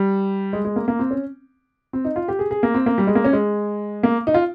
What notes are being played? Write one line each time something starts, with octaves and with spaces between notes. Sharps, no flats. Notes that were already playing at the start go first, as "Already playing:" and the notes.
Already playing: G3
G#3
G#3
A#3
A#3
C4
C#4
C4
D#4
F4
G4
G#4
G#4
A#3
C4
A#3
G3
G#3
A#3
C#4
G#3
A#3
D#4
F4